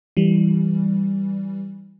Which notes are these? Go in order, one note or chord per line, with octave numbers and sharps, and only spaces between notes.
E3 G3